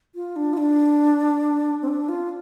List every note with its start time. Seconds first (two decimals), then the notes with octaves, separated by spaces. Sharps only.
0.15 F4
0.36 D4
0.53 F4
0.57 D4
1.82 C4
1.88 D4
2.09 F4